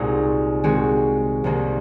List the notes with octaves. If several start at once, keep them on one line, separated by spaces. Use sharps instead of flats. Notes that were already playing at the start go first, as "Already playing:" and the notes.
Already playing: C2 A#2 G#3 D#4 F#4
D#3 G#3 C4 F#4
C2 C3 D#3 A#3